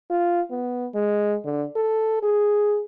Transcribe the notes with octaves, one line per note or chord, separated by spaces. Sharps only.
F4
B3
G#3
D3
A4
G#4